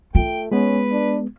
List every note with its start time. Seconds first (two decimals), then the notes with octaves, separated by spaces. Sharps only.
0.15 A3 F4 G5
0.52 G#3 B3 C#4 B4
0.92 D4